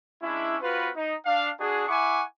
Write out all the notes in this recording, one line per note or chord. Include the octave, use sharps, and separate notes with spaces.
G#3 C#4 D4 E4
C4 F4 F#4 B4
D#4
D4 F5
D4 F#4 G#4
E4 F#5 G#5 C#6 D6